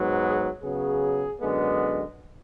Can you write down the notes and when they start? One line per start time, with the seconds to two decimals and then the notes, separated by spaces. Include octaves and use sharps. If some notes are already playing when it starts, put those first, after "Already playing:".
Already playing: G#2 F#3 B3
0.25 G#4
0.63 C#3 F#3 B3 G#4
1.40 F#2 D3 G#3 B3